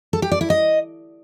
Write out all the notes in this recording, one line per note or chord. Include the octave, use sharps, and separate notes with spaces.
A4
G4
D5
E4
D#5